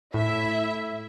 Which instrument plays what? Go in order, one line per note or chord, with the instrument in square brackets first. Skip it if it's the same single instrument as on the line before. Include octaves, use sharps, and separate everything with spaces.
[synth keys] A2 [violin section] E4 E5